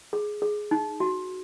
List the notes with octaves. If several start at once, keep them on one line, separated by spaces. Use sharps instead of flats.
G#4
G#4
D#4
F#4